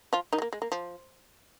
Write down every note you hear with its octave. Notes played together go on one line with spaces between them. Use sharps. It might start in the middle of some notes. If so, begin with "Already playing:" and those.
F3 F4
D#3 D#4
G#3
A#3
G#3
A#3
F3